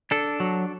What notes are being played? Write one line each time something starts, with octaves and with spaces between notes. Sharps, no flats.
D4 A4
F#3